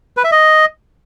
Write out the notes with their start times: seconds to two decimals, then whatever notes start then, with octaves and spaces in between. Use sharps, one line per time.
0.17 B4
0.24 E5
0.32 D#5